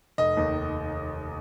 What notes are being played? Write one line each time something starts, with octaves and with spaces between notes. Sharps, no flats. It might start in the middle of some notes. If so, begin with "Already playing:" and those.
F1 D#5
D#2 D#3